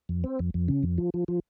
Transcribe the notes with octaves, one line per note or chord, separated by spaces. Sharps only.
F2
C4
F2
F2
C#3
F2
F3
F3
F3